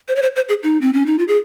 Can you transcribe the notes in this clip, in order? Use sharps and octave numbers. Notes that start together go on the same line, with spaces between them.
C5
C#5
C5
C5
G#4
D#4
C4
C#4
D#4
F4
G#4